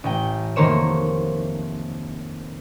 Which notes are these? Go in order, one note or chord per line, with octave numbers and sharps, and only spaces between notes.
A1 G5
F1 D#3 A#3 C5 C#5 E7